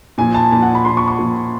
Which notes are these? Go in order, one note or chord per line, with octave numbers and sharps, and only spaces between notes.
A#2 F3 G#5
A5
A#2 F3 A5
F#5
B5
A#2 F3 C6
C#6
C#6
A#2 F3